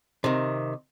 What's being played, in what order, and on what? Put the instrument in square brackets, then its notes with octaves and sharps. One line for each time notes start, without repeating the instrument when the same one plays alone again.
[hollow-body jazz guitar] C3 D#3